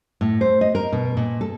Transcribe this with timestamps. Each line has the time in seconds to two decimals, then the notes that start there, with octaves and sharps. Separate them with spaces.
0.21 A2
0.41 C5
0.61 D#5
0.75 A#4
0.92 B2
1.17 A#2
1.41 A4